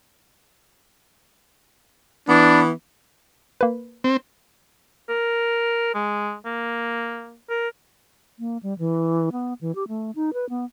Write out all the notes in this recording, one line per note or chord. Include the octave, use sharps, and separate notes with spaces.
E3 B3 D4
A#3 B4
C4
A#4
G#3
A#3
A#4
A#3
G3
E3
B3
E3
G4
A3
D#4
B4
B3